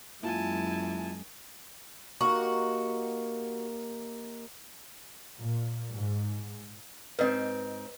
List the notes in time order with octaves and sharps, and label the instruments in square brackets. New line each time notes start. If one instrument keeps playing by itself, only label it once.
[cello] F#2 G#3 [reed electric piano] A#3 F4 [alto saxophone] E4 [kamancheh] G#5 A5
[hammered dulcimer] A#3 D#4 G4 [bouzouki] F#4
[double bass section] A#2
G#2
[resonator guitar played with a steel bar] G#2 C4 [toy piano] B4 D#5